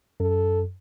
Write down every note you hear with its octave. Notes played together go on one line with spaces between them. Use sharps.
F#2 A4